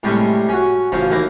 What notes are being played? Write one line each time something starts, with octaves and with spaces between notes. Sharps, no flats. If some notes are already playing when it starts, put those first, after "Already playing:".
A2 C3 G3 G#3 C#4
C#4 F#4
A1 C#3 F3 F#3
D#2 A#3 E4 A#5